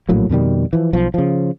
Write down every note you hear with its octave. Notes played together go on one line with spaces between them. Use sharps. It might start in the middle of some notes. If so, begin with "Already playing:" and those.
A#1 A2 F#3 A#3
F2 B2 D#3 G3
E3 F3
B1 F3
C#3 F3